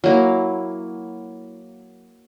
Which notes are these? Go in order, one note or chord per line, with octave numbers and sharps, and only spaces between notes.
F#3 A#3 E4